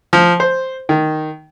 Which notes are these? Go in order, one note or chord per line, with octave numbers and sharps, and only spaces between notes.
F3
C5
D#3